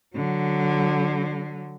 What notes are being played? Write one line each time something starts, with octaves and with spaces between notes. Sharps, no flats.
D3 F#3